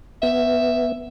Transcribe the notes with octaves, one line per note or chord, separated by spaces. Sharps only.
B3 E5